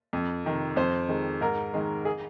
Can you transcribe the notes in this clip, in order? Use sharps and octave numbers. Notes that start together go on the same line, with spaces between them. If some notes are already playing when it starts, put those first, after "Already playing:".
F2
C3 D#3
F2 C5
D#3 G#3
G#2 A#4
D#3 G#3
G#4